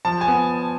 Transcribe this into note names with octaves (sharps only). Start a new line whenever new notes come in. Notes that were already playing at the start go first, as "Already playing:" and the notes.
F3 A5
G#5
B3